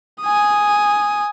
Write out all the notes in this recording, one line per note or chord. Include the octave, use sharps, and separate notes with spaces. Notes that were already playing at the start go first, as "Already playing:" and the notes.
G#5 D#6